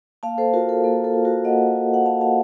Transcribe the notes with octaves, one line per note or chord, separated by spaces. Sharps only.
A#3 F5 A5
A4 C5
F4 F#4 A#4
A4
A#3 A4
A4
F4
F#4 A#4
A#3 D#5 F#5
F4
F#5
A#3 F5 A5
F5 A5